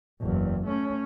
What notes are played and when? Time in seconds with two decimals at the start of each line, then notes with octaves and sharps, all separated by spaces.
0.21 F#1 E2
0.66 A3 C#4